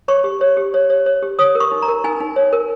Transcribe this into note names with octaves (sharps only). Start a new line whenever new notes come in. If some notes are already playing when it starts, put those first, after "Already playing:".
C#5 C#6
G4
C#5
G4
C#5
C#5
C#5
G4
C#5 D#6
A#4
C#6
D#4
A#5
A#4
D#4 G#5
D#4
C#5
A#4